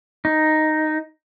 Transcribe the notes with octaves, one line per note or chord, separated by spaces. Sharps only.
D#4